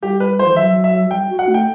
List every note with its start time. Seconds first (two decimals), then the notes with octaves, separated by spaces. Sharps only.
0.03 G3 G4
0.20 B4
0.39 C5
0.46 E3
0.56 F#3 E5
0.84 E5
1.11 G3 G5
1.29 F#4
1.39 F#5
1.48 A3
1.54 G5